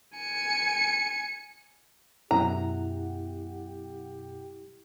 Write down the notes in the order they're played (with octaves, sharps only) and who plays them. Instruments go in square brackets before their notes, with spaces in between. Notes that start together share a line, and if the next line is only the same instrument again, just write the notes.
[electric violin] G#5 C#7
[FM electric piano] F#2 B2 F#5 [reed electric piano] E4 [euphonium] G4 [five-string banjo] A#5